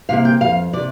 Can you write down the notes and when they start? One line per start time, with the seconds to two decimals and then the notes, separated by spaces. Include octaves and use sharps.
0.09 C3 A#3 F5
0.25 G5
0.41 F2 F5
0.73 C3 D5